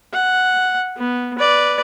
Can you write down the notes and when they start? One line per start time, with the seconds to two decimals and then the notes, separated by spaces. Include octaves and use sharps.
0.13 F#5
0.97 B3
1.39 B4 D5